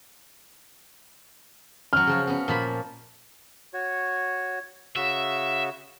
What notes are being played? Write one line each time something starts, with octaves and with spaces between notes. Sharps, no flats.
F#3 C#4 F6
C#3 F3 F#4
B3 C#4
A#2 F3 B5
F#4 C#5
C#3 F#4 E5